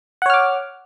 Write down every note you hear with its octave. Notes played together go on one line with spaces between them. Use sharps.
C#5 F#5 D6 F6